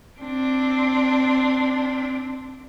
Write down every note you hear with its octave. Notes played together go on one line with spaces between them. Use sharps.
C4 D4